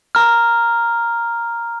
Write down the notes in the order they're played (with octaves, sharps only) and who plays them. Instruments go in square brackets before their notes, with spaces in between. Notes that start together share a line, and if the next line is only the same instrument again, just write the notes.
[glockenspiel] A#5 F6